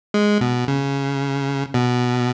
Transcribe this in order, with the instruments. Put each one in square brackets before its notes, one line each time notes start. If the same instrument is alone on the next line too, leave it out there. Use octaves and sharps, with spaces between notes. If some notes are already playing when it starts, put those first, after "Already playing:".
[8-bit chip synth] G#3
B2
C#3
B2